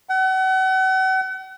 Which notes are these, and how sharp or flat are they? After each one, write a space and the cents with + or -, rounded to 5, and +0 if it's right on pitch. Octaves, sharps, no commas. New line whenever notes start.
F#5 +35